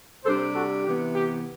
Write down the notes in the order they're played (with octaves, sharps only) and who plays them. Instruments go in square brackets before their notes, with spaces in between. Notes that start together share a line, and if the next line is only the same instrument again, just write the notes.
[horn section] C3 G3 D4 A4 C5
F#4 A4
C3 E3 B3 G4
G4